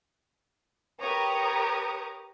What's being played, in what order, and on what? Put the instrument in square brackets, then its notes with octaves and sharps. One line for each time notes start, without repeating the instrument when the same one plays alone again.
[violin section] G4 A#4 B4 C#5 A#5 D#6